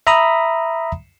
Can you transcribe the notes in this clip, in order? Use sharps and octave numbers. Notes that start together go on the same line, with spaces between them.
E5 A#5 B5 D#6